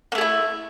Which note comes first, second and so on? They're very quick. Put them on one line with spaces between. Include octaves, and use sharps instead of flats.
A#3 A3 G#4 E4